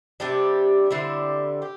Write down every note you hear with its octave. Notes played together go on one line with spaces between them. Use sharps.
C3 G3 D4 G4
D3 G3 C4 E4
G4